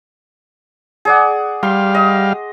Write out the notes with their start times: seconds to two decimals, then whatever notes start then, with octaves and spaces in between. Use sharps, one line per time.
1.05 G#4 D5 F#5
1.63 G3 F5 C6
1.95 D#5